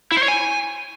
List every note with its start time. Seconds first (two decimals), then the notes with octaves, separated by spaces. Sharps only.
0.12 E4
0.17 C5
0.23 C#5
0.28 G#5